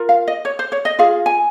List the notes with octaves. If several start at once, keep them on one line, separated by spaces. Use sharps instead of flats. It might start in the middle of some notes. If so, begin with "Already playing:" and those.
Already playing: F4 A#4
F5
D#5
C#5
C5
C#5
D#5
F4 G#4 F5
G#5